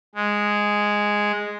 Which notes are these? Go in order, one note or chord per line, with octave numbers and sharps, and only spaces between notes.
G#3